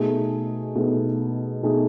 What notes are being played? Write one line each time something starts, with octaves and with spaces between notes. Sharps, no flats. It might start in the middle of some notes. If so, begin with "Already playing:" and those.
Already playing: B2 A3 D#4 G#4
B2 A3 D#4 G#4
B2 A3 D#4 G#4